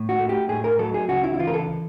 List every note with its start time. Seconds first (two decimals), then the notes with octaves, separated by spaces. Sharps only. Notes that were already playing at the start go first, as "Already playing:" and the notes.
Already playing: A2
0.09 F#4
0.19 A3
0.29 G4
0.49 A2 G#4
0.64 A#4
0.79 F#3 A4
0.94 G#4
1.09 C#2 F#4
1.24 E4
1.34 E4
1.39 E3 F4
1.47 A#4
1.54 A4